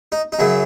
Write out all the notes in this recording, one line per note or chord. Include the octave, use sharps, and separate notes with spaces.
D#4
D#4
F#2 C#3 F#3 E4